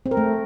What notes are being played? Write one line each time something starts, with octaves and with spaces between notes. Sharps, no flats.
C4
A#4
A3